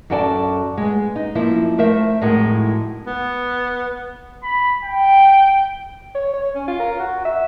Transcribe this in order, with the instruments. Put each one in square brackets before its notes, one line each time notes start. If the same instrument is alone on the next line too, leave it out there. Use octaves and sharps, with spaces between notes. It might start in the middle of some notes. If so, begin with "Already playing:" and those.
[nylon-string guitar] F#2 F#4 A4 D5 G5 A5
G#3 B3
D#4
F#2 F3 A#3 E4
A3 A#4 C5 E5
F2 A2 G#3 D#4 F#4 A#4
[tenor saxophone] B3
[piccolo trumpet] B5
G5
[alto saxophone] C#5
C#5
C#4
F4
A#4
F#4
E5